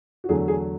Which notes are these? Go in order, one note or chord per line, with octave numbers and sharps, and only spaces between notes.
F#4
E2 D3 F#3 A3 G#4
G#4